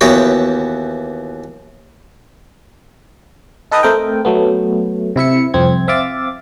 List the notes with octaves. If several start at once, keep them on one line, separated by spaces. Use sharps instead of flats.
D#2 E3 B3 F#4 C#5 G5
D#4 A4 B4 D#5 G5 D#6
A3 C4 A4 A#4 G5
F#3 A3 B3
C3 E4 E5 C#7
C2 F2 C4 G#6
C4 E5 F5 D6 A6